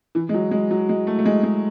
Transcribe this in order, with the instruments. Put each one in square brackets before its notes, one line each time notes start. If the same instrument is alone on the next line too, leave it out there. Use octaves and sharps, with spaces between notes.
[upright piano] E3
G#3
F#3
G#3
F#3
G#3
A3
A3
G#3
G#3